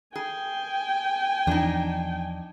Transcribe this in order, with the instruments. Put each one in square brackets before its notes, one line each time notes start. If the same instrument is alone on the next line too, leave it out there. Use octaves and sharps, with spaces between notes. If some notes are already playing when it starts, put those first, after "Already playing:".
[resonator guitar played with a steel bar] G#4 [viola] G5 G#5
[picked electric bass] E2 F3 [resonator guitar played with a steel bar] D4 D#4